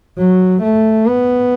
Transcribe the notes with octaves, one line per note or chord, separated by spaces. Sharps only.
F#3
A3
B3